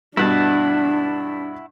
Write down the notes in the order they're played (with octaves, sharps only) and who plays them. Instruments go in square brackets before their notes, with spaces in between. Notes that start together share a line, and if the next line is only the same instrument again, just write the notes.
[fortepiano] G2 B2 [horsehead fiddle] D4 [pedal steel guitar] E4 F#5 A5